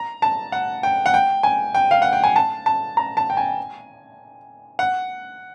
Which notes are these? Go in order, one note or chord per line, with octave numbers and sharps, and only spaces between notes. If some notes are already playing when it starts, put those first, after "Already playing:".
Already playing: A#5
A5
F#5
G5
F#5
G5
G#5
G5
F5
F#5
G5
G#5
A5
A5
A#5
A5
G5
G#5
F#5